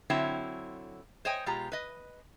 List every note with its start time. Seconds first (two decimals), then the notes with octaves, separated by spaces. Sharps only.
0.10 D3 F#3 C4 E4 C#5 G5
1.25 C5 C#5 D#5 G5 G#5
1.46 B2 G#3 F4 G4 A#5
1.72 B4 D#5